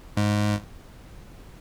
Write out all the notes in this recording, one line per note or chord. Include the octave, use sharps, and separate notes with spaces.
G#2